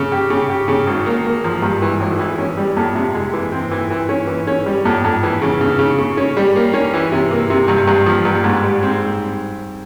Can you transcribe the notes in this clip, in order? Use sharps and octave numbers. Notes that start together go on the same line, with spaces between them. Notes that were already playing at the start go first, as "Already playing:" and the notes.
Already playing: C#3
G4
C#3
G4
C#3
G#1
A#3
A#3
F3
G2
E3
G#1
E3
C#4
G3
F2
C3
G#3
E3
C4
E3
E3
C#4
E3
C#4
G3
F2
F2
E3
C#3
C#3
C#3
C#3
C#4
G3
A#3
C#4
E3
C3
A#3
C3
G2
G2
F3
G2
G#2
G3
C4